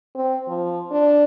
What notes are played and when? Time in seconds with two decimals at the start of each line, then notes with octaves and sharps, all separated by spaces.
0.15 C4
0.48 F3
0.91 D4